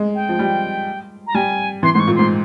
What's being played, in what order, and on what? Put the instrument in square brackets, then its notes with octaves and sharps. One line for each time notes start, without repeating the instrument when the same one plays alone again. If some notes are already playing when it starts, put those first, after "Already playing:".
Already playing: [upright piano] G#3
[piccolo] G5
[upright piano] F3
G3
[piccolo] A#5
[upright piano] G3 [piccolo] G#5
[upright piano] E3 [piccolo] C6
[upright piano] G#2 [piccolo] C6
[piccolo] C#6
[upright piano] A#2
[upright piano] G#2 [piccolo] C6